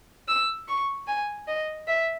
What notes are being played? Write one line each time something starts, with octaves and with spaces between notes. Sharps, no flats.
E6
C#6
G#5
D#5
E5